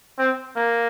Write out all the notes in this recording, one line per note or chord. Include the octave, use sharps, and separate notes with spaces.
C4
A#3